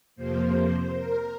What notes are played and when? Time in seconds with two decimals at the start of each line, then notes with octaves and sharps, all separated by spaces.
0.16 F2 C3 F3 A#3 C5
0.92 A#4